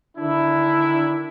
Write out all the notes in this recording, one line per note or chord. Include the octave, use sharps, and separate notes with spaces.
D3 D#3 D4 E4